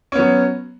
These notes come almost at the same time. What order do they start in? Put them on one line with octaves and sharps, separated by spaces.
C#4 B3 F#3